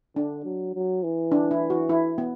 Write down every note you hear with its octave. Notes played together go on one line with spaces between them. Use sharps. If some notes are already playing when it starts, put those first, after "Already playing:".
D3 D4
F#3
F#3
E3
D4
E4
F#4
E4
B3